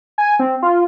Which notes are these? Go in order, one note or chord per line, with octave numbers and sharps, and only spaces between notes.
G#5
C4
F4